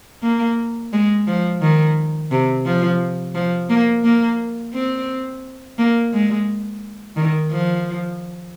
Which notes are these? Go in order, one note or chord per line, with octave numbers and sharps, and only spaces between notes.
A#3
G#3
F3
D#3
C3
F3
F3
A#3
A#3
C4
A#3
G#3
D#3
F3